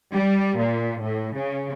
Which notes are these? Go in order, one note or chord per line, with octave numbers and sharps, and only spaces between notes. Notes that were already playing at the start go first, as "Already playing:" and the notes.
G3
A#2
A2
C#3